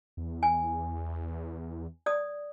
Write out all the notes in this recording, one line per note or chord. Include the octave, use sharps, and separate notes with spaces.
E2
G#5
D5 D#6